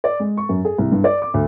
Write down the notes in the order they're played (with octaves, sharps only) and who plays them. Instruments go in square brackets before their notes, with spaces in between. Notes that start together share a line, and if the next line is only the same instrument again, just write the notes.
[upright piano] D5
G#3
C#6
F#2
G#4
C2
G2
D5
D6
D2